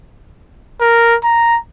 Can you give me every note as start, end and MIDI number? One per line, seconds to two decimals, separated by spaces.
0.80 1.15 70
1.24 1.58 82